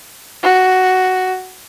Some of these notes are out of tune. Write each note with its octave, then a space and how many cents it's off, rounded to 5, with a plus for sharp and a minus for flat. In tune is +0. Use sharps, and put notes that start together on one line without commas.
F#4 +5